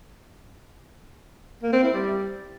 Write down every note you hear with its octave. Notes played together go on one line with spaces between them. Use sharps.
A#3
C4
E4
G3